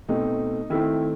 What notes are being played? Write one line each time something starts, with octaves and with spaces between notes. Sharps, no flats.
B2 A3 C4 D#4
D#3 A3 C4 E4